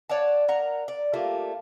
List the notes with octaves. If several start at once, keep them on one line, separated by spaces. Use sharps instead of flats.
C#5 D5 F#5 A5
A#4 F#5 A#5
D5
G3 A3 A#3 F4